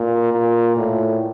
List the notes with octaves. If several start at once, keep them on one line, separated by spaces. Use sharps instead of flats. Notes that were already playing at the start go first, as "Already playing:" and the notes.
Already playing: A#2
A#2
A2